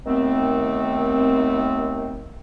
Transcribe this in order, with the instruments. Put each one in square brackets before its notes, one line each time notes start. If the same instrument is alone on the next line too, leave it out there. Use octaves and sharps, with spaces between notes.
[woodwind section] D#2 D#3 A3 B3 C4